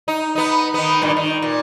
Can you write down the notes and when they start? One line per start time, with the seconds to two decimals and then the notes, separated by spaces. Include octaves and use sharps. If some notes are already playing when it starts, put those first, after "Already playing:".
0.08 D#4
0.35 B3 D#4
0.74 D#3 B3
1.02 G2 A#2 D#3
1.17 D#3
1.42 A#2